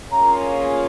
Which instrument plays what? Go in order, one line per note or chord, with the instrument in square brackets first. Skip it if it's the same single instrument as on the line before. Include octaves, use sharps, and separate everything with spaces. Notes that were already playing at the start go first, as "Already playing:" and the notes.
[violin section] A#3 C#4 F4 G#4 [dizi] A#5